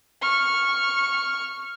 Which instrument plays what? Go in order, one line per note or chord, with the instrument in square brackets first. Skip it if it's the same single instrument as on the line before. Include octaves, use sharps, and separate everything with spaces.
[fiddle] C#6 F6